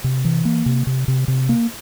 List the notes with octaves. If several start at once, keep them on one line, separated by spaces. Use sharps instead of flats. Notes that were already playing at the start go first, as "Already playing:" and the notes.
C3
E3
A#3
C3
C3
C3
C3
A#3